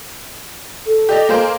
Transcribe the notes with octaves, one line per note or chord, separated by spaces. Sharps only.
A4
G4 D5 D#5
A#3 G#4 C5